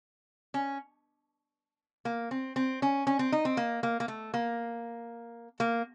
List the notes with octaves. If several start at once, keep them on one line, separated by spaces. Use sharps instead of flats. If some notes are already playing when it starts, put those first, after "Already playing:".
C#4
A#3
C4
C4
C#4
C#4
C4
D#4
C4
A#3
A#3
A#3
A3
A#3
A#3